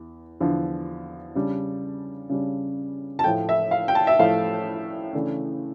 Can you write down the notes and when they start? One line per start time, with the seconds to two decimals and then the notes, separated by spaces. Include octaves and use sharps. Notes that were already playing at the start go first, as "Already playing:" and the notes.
Already playing: E2
0.40 E2 D3 F3
1.35 C#3 G3 D4
2.29 C#3 G3 D4
3.19 A5
3.24 A2 F3 A3 G5
3.49 E5
3.71 F5
3.88 G5
3.95 A5
4.07 E5
4.19 A2 F3 A3 F5
5.13 C#3 E3 A3 D4